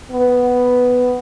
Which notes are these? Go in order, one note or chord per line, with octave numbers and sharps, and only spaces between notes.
B3